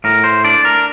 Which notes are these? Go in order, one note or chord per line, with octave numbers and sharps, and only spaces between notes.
A2 A#4
C5
D4 D5
A#4